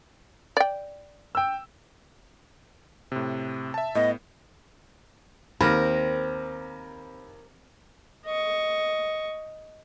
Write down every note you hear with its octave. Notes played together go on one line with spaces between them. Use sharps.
D5 G5
G5 E6
A2 C3
E5 A5
A2 B3 D#5
D#2 C4 A#4 B5 F6 A#6
D#5 C#6